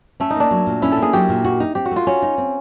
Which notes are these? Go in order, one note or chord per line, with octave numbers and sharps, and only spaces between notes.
A3 C#4
D#4
A#3 D4
F#3
A#2
C#4 E4
A4
A#3 G#4
F#3 G4
A#2
F#4
D#4
C4 G4
F#4
A3 F4
C#4 F#4
D#4
C4